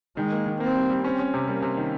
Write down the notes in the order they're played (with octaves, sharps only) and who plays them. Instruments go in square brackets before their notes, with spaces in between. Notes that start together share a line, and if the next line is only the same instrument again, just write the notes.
[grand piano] D#3 [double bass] G#3
[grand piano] A#3
D#3
[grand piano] A#3 [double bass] C4
[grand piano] G3
G3
[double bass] C4 [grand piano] C#4
[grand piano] C#4
C3
[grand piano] G3 [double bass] A#3
[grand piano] C3
D#3